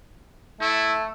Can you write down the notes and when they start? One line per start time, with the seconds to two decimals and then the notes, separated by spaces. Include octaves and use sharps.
0.61 A3 E4